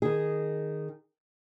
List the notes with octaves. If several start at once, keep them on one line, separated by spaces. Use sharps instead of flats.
D#3 G#4